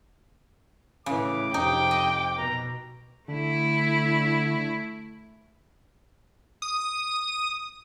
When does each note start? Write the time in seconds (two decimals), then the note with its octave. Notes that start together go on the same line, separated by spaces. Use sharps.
1.06 A2 C#3 E3 D6
1.54 F2 C3 D#4 G5
1.91 D#5
2.37 B2 A#5
3.28 D3 A3 E4
6.62 D#6